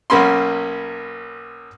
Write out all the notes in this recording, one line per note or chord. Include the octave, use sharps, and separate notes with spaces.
B1 A#3 C#4 B5 C6